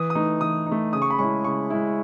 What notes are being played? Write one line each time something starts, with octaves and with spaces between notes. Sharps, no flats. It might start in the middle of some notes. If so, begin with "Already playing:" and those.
Already playing: E3 D#6
D#6
A3 D#4
E3 D#6
A3 D#4
C#3 D#6
C#6
B5
G#3 C#4 E4 C#6
C#3 C#6
G#3 C#4 E4